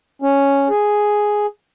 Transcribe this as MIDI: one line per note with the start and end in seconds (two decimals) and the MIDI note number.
0.22 0.68 61
0.70 1.46 68